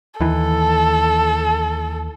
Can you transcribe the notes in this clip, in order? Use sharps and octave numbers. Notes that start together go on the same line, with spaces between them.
D#2 E3 A4